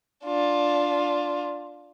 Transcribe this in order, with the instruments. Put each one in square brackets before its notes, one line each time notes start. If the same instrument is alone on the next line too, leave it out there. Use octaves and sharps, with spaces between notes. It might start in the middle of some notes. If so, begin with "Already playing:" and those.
[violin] D4 F4